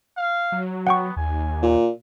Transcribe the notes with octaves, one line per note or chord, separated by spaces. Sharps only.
F5
F#3
B3 F#5 G5 C#6
D#2 G#5
A#2